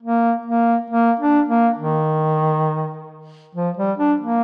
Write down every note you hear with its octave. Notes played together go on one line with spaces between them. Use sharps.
A#3
A#3
A#3
D4
A#3
D#3
F3
G3
D4
A#3